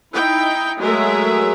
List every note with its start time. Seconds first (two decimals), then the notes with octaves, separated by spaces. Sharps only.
0.13 D#4 E4 G5
0.79 F#3 G#3 A3 G#4 A#4 E5